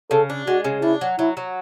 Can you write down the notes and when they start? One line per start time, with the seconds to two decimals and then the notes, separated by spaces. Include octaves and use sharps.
0.11 C#3 A4
0.30 D4
0.47 G#3 F#4
0.65 C#3
0.82 D4 E4
1.01 F#3
1.19 F#3 E4
1.37 F#3